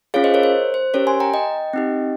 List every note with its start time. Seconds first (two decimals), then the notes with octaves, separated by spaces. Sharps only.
0.14 C#4 F4 G#4 C#5 F5
0.24 C5 D#5
0.34 A#4 C#5
0.43 C5
0.74 C5
0.94 C#4 G4 A#4 C#5
1.07 G#5 C6
1.20 G5 A#5
1.34 D#5 G5
1.73 C4 D#4 G4